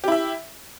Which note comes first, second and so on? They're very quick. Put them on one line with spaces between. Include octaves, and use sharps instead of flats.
G4 E4 E5